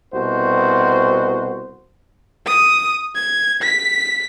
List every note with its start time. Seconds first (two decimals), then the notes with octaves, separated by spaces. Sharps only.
0.13 C2 B2 F#4 C5
2.46 D#6
3.16 G#6
3.63 B6